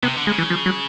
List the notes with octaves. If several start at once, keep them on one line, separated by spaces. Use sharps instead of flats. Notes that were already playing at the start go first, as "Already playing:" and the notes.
C3 B3
D3
C#3 G#3
E3
F3
F#3